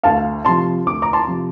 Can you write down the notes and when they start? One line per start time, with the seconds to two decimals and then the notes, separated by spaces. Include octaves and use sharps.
0.03 D2 F5 A5
0.45 C3 F3 A5 C6
0.86 D2 D6
1.02 A#5 D6
1.13 A5 C6
1.27 C3 F3